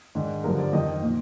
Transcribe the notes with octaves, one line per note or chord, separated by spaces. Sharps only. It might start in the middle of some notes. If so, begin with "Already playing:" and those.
G#2 D#3 D4
G2 D3 F3 A#4
D5
F2 D#3 D#5
A#2